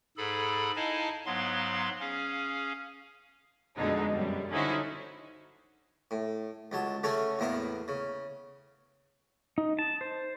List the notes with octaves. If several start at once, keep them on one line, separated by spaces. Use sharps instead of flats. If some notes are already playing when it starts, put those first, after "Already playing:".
G#2 G#4 A4 B5
D#4 E4 D#5 F5 G#5 A5
G#2 F#3 B3 F5 C6
C#4 G#4 F5
F2 B2 D3 G#3 A3 D#4
F#2 G3
D3 C#4 D#4 E4 F#4 C5
A2
C#2 F#3 A5
C#3 A3 C#4 F#4 A4
E2 A2 A#3 B3 B5
C#3
D#4
A5
C5